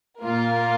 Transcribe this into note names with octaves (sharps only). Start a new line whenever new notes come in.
A#2 A#3 F4 A#4